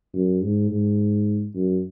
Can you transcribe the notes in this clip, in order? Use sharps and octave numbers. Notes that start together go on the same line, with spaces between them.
F#2
G#2
G#2
F#2